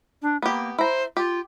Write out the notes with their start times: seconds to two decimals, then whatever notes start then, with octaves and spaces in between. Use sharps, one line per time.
0.22 D4
0.42 A#3 B3 G4
0.78 E4 C5 A#5
1.17 F4 G4